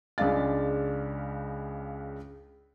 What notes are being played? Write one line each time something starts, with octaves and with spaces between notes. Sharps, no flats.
C#2 C#3 G#3 D4 F5 A6